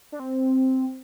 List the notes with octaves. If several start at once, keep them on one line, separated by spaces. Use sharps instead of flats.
D4
C4